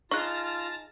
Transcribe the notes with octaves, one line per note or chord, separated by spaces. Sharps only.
D#4 F4 G#4 A5 C#6 F6 F#6 A#6